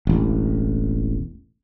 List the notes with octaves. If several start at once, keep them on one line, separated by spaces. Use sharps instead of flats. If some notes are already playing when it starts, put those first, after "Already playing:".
E1 A1